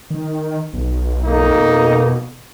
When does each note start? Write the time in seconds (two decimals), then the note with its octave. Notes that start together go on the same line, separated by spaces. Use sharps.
0.10 D#3
0.73 B1
1.24 F2 A#3 D#4
1.55 B2